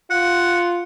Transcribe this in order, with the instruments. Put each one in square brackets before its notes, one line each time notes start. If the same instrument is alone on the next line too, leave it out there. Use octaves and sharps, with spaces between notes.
[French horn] F4 [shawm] F#5